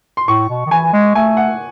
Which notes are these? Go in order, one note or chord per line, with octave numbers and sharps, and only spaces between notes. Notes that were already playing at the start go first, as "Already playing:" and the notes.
C6
A2 C#6
B2
D#3
E3 G#5
G#3
A3 G#5
F#5